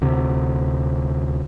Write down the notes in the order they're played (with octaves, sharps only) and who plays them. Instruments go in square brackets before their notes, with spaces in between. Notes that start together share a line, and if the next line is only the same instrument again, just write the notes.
[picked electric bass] D2 C3